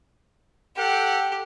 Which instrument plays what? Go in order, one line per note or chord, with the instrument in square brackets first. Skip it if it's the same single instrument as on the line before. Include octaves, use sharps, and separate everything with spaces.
[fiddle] G4 [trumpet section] A4 F#5 G5